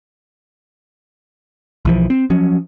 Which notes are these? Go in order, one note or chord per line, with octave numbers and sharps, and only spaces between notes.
B1 E3 F3
C4
F3 F#3 C#4